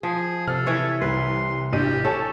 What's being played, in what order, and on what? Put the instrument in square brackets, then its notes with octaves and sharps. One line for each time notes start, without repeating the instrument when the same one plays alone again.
[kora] F3 [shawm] G#4
[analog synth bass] C3 [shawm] A4 [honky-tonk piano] F6
[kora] E3 B4 C#5
[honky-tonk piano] C2 [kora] B4 [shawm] C6
[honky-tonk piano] A1 D4 D#7 [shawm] G4
[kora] A4 [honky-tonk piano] C#5 G#5 A5